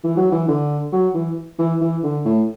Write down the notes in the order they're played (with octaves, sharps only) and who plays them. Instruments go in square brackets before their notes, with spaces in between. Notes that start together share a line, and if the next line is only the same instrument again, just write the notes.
[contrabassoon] E3
F#3
E3
D3
F#3
E3
E3
E3
D3
A2